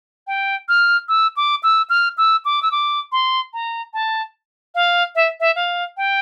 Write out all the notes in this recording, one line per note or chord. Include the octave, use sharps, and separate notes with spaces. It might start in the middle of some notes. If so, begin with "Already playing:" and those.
G5
F6
E6
D6
E6
F6
E6
D6
E6
D6
C6
A#5
A5
F5
E5
E5
F5
G5